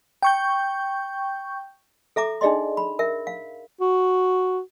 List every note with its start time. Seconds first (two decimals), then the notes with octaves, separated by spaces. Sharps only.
0.23 G5 C#6 G6
2.16 A4 E5 A#5 D6
2.41 D4 D#4 G#4 D5 D#5 C6
2.77 B5
2.99 A#4 E5
3.27 F5
3.81 F#4